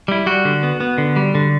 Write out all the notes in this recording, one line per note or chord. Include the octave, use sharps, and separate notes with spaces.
G3 E4
G3 F#4
D3
B3
B3
D3
G3
D3